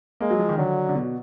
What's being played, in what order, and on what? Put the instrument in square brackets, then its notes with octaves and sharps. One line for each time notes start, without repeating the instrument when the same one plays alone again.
[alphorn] G#3 [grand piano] A#3
[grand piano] F#3
F3
D#3
[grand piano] D3 [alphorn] F#3
[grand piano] D3
B2